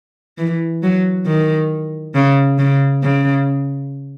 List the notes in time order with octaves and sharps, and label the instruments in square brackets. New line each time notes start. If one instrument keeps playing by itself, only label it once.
[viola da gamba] E3
F#3
D#3
C#3
C#3
C#3